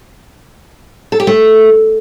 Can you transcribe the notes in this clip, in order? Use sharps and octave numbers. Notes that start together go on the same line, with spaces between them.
A4
G4
A3